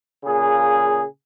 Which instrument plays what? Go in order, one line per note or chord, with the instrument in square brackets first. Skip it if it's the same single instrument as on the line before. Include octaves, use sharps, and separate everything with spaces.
[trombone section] A#2 C#3 G#4